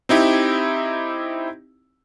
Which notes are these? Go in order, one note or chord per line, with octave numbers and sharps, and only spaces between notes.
C4 D#4 E4 G4